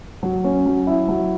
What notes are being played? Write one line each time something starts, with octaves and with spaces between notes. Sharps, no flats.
F#3
C#4
F#3
E4
F#3